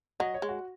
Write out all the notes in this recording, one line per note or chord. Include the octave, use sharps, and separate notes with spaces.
F#3 D#5
C#5
G#3
F#4